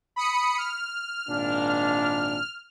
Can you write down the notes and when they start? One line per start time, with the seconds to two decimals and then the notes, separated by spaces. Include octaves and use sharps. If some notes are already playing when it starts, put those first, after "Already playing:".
0.16 B5 D#6 C#7
0.58 F6
1.29 G#1 A#2 D4